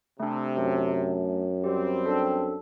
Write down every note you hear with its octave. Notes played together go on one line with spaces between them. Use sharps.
C3 A3 D4
F#2
G3 C4 G4
D4 A4